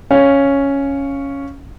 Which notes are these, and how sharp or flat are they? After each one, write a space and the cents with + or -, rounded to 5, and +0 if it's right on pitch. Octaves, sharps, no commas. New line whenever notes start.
C#4 +0 F5 +0